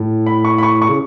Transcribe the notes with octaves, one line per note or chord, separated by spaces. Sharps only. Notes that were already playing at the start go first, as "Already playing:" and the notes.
Already playing: A2
B5
C#6
B5
C#6
C#6
C#3